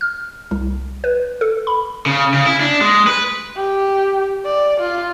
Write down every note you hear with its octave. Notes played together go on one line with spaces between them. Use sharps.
F6
C2
B4
A4
B5
C#3
C#3
E4
D4
G#3
B4
G4
D5
F4